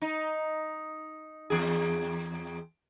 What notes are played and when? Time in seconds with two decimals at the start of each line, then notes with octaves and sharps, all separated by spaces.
0.02 D#4
1.50 E2 G#4